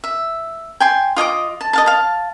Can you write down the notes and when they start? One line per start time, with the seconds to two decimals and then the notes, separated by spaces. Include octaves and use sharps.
0.04 E5
0.80 G5 G#5 C6
1.16 F4 D#5 G#5 D6
1.61 A5
1.73 D#5 F5 A5
1.86 F5 A5